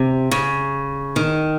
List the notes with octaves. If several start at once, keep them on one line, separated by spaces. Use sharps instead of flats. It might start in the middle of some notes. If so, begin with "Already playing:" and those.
Already playing: C3
C#3
D#3